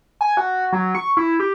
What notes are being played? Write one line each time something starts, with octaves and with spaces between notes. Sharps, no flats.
G#5
F#4
F#3
C#6
E4
G4